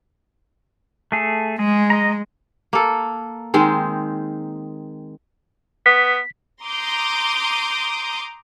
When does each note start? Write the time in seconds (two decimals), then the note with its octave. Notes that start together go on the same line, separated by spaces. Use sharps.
1.12 A3 G#4 A4
1.59 G#3 G#4
1.90 D#5 A#5
2.73 A#3 A4
3.54 D#3 G#3 C4
5.86 B3 B6
6.63 A#5 C6 D6 D#6 G6